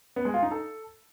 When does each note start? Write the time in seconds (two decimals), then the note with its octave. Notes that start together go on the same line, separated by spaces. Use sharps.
0.16 B3
0.25 G#3
0.34 F4
0.43 D#4
0.51 A4